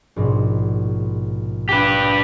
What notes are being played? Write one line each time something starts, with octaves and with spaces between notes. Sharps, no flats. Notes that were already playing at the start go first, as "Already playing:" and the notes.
A#1 G#2 B2
G4 B4